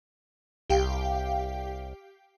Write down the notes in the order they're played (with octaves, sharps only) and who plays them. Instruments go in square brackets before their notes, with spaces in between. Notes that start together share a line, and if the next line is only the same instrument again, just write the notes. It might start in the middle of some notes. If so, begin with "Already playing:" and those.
[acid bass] C2 [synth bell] G4 F5 G5